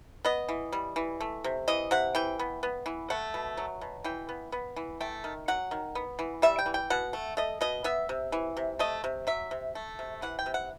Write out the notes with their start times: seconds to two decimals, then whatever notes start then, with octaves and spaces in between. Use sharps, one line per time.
0.25 B3 D#5
0.49 E3
0.73 G3
0.96 E3
1.20 A3
1.44 C3
1.68 E3 D#5
1.91 C3 F#5
2.15 E3 G5
2.39 B3
2.63 B3
2.86 E3
3.10 A3 F#5
3.34 B2
3.57 F#3
3.81 B2
4.04 E3 G5
4.29 B3
4.52 B3
4.76 E3
5.00 A3 G5
5.24 D#3
5.48 F#3 F#5
5.71 D#3
5.95 B3
6.19 E3
6.42 G3 E5
6.59 G5
6.66 E3
6.74 G5
6.90 B2 F#5
7.13 A3
7.37 A3 D#5
7.61 B2 D#5
7.84 B3 E5
8.09 C3
8.32 E3
8.57 C3
8.79 A3 D#5
9.04 C3
9.27 F#3 E5
9.51 C3
9.75 A3
9.99 C3
10.22 E3 F#5
10.39 G5
10.46 C3
10.54 F#5